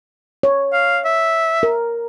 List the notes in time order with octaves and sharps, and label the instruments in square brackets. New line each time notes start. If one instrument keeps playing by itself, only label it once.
[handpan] C#5
[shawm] F5
E5
[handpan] A#4